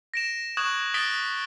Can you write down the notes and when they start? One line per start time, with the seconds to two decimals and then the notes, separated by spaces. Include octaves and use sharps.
0.14 A#6 D7 E7
0.57 C#6 D#6 F#6 G#6 E7 F#7
0.94 D#6 A6 B6 D7 G7